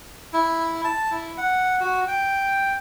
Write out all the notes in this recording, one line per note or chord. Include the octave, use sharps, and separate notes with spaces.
E4
A5
E4
F#5
F#4
G5